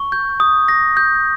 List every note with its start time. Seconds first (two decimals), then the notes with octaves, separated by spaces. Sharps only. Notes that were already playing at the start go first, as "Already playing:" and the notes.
Already playing: C#6
0.12 G6
0.40 D#6
0.68 A#6
0.97 G6